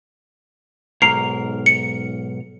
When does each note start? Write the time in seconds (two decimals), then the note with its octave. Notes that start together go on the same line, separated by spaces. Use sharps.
1.02 B1 G#2 A#4 C7
1.66 C#7